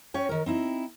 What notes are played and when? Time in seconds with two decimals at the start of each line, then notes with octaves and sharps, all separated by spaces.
0.14 C#4 C#5 G5
0.29 D#3 A#4
0.46 C4 D#4 E4